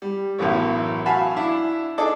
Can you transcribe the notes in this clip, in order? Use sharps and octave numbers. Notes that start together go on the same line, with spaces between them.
G3
B1 F#2 A2 E3 C#5
F#4 F5 G#5 A5 B5
D4 E4
D4 D#4 G#4 A4 D5 D6